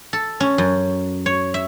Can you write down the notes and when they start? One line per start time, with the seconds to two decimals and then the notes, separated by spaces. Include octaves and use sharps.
0.13 A4
0.40 C#4
0.58 F#2
1.26 C#5
1.54 E5